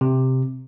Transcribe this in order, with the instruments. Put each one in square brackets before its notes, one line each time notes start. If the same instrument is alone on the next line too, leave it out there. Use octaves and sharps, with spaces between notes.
[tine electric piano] C3